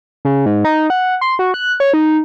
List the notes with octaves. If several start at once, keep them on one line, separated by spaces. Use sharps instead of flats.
C#3
G#2
D#4
F#5
C6
F#4
F#6
C#5
D#4